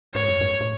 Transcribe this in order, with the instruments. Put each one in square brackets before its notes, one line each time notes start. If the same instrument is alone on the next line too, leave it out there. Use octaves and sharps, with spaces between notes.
[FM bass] G#2 [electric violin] C#5
[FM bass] F#2
G#2
A2